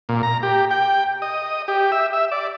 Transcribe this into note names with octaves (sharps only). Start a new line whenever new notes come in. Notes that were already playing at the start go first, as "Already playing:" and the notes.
A#2
A#5
G4
G5
D#5
G4
E5
E5
D5